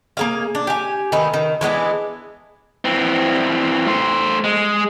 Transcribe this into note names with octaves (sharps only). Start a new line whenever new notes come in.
A#3 G#4 F5
D4
G4 G#5
D#3 A3 B3 D#4
D#3
E3 G#3 B3 D4
E3 C4
A3 C5
G#3